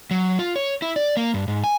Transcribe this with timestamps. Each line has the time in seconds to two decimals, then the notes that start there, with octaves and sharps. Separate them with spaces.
0.11 F#3
0.39 F4
0.56 C#5
0.82 E4
0.96 D5
1.17 A#3
1.34 G2
1.48 G#2
1.64 G#5